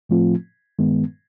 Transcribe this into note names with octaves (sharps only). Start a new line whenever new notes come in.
A2 F3 A3 C4 F4
G2 D#3 G#3 B3